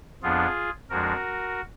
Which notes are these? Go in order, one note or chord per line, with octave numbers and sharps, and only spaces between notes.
F2 F3 B3 D4 F4 G#4
F2 F3 G#3 D4 F#4 A#4